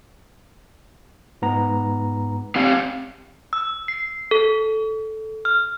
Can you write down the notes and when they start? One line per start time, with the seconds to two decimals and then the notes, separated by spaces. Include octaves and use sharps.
1.42 G#2 B3 A#5
2.56 C4 G4 F5
3.53 E6
3.88 C7
4.31 A4
5.45 F6